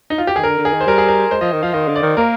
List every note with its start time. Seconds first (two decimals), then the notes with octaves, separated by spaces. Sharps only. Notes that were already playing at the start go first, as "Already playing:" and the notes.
0.10 D#4
0.18 F4
0.27 G4
0.36 D#3 G#4
0.43 D3 A#4
0.58 D3
0.65 G#4
0.74 D#3
0.81 C5
0.87 G3 A#4
0.98 G#4
1.09 A#4
1.31 G#3 C5
1.41 F3 D#5
1.53 D#3
1.63 F3 F5
1.74 D#3 D#5
1.88 D3
1.96 D5
2.03 D#3
2.17 A#3 A#4